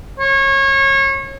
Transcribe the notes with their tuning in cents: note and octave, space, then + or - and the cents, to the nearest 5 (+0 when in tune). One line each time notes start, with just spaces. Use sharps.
C#5 -30